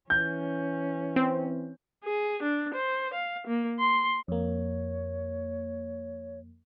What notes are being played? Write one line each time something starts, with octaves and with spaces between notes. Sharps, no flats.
E3 C#4 G6
C4
G#4
D4
C5
F5
A#3
C6
F2 A#3 C#5